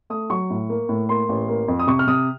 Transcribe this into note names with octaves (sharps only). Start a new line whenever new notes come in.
A3 D#6
F#3 C#6
A2
A#3
A2
A#3 C6
A1
A#3
F2
D#6
C3 C#6
F6
C3 D#6